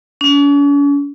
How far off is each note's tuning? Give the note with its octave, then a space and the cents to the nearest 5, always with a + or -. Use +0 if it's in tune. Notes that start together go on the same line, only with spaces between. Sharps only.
C#4 +45